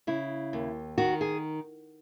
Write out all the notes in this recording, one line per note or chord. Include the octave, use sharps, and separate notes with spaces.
C#3 E4
D#2
D#3 F#4
G#4